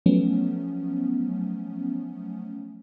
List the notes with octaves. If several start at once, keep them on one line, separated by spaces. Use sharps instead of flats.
F3 F#3 A3 B3 C#4